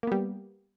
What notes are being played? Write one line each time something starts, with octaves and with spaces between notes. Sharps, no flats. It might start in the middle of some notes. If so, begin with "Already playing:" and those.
G3 A#3 B3